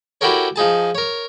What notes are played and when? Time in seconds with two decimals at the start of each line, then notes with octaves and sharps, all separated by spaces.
0.21 E4 F#4 G4 A4 A#4 C#5
0.56 F3 D#4 G#4 A5
0.95 A#4 C#5